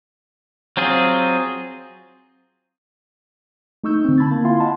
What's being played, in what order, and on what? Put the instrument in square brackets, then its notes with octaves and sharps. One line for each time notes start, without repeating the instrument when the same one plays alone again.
[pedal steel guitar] F#3 C4 F4 G#4
[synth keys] A3 D#4 C#6 E6 G6
D3 C4
A5 B5 G#6 A6
A#3
E4 F4 E5 F5 G#5 C6
D#5 F#5 A5 B5 C6